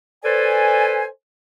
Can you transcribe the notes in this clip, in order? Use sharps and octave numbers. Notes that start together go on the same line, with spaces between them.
A4 B4 C5 D5 G#5